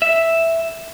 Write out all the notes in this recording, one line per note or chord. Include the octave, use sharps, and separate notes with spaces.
E5